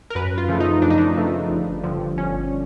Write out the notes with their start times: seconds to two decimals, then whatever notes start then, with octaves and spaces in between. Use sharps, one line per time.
0.10 A#4
0.15 F#2 B4
0.38 F4
0.48 C#3 F3 A3
0.60 D#4
0.82 F#2 D4
0.90 D#4
0.98 D4
1.16 C#3 F3 A3
1.49 G1
1.84 G2 D3 F3
2.17 G1 C#4